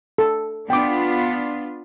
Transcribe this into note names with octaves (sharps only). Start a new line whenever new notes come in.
A4
B3 D4 F4 G5 D6